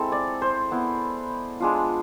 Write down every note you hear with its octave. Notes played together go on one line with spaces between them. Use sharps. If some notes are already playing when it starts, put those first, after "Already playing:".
Already playing: G#3 C4 E4 A4
D5
C5
B3 E4
G#3 D4 F4